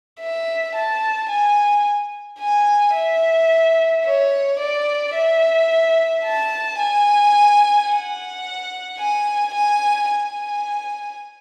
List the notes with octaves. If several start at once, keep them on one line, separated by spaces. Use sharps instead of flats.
E5
A5
G#5
G#5
E5
C#5
D5
E5
A5
G#5
F#5
G#5
G#5
G#5